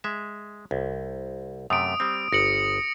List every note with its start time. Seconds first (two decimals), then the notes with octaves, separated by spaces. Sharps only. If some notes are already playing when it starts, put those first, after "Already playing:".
0.04 G#3 E5
0.71 C2
1.70 F#2 C3 A3 D#6 D7
2.00 G3 C4
2.32 G1 A#6 C#7 F#7